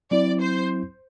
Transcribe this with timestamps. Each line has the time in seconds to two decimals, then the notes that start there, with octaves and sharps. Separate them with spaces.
0.11 F#3 C4 E4 D5
0.41 C5